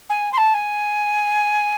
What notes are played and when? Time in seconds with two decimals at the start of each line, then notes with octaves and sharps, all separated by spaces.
0.10 G#5
0.33 C6
0.38 A5
0.54 G#5